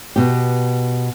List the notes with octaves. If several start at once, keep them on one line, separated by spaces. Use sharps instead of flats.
B2 G4